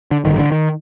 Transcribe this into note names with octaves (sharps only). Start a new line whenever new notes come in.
D3
A1 G2 D3 D#3
D3
D#3